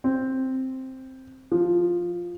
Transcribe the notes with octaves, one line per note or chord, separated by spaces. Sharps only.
C4
F3